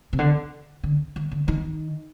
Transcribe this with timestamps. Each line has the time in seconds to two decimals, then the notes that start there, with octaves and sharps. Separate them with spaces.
0.13 C3
0.19 D3
0.84 D3
1.16 D#3
1.31 D3
1.48 D#3